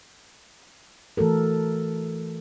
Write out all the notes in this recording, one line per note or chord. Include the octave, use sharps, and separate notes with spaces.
E3 A3 F#4 A4 A#4